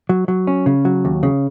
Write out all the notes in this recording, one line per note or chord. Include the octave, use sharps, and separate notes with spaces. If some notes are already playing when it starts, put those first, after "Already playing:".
F#3
F#3
C#4
C#3
F#3
D#2
C#3